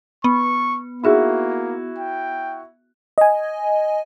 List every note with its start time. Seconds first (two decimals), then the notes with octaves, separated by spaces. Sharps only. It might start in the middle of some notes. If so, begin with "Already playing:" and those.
0.24 B3 C#6
1.04 A#3 D#4 E4 F#4 G#4
1.98 G5
3.18 D#5 G#5